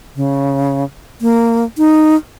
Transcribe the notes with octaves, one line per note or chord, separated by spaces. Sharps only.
C#3
A#3
D#4